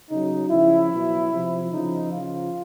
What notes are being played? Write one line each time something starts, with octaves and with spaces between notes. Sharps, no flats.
C#3 F#3 D#4
C#3 F3 E4
B2 F#3
C3 F3
C#3 F3 D#4
C#3 F3 F4